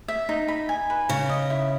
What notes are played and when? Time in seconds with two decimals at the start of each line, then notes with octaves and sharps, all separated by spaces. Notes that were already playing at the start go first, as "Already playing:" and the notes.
0.08 E5
0.29 D#4
0.48 B5
0.69 G#5
0.90 B4
1.09 C#3 A#5
1.29 D#5
1.50 E4